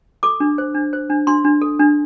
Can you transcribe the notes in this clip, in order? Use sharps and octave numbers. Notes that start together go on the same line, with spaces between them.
A4 D6
D4
C5
D4
C5
D4
D4 C6
D4
A4
D4